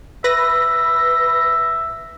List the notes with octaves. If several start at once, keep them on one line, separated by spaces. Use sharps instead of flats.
B4 E5 A#6